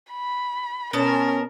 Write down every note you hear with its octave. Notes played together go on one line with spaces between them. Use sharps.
B5
B2 B3 C#4 A#4 A5